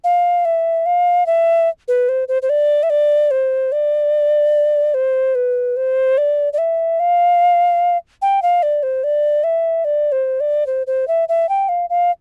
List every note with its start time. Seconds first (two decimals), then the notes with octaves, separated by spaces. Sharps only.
0.04 F5
0.45 E5
0.86 F5
1.26 E5
1.88 B4
2.09 C5
2.28 C5
2.42 C5
2.50 D5
2.83 E5
2.90 D5
3.31 C5
3.72 D5
4.94 C5
5.35 B4
5.77 C5
6.18 D5
6.53 D5
6.58 E5
7.00 F5
8.22 G5
8.42 F5
8.63 D5
8.83 C5
9.04 D5
9.44 E5
9.85 D5
10.12 C5
10.40 D5
10.67 C5
10.87 C5
11.08 E5
11.29 E5
11.49 G5
11.69 F5
11.90 F5